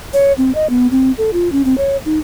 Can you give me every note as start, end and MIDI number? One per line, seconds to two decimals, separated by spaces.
0.13 0.33 73
0.38 0.53 60
0.55 0.69 75
0.69 0.87 59
0.91 1.12 60
1.18 1.30 69
1.33 1.51 65
1.52 1.62 61
1.65 1.75 60
1.78 1.97 73
2.05 2.19 63